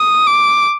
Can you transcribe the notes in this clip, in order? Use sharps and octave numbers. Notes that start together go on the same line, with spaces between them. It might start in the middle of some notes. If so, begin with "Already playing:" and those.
Already playing: D#6
D6